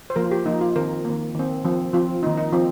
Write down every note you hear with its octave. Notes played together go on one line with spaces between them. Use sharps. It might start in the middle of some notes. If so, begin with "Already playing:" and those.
C5
F3 A#3 A#4
F4
G4
F3 A#3 D#4
F4
D#3 C4 A#4
D#3 A#3
D#3 C4
F3 C4
F3 C4 F4
D#3 A#3 D#4
D#4
F3 C4 F4